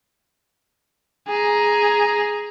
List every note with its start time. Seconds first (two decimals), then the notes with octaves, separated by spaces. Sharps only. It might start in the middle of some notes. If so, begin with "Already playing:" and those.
1.28 G#4 A#5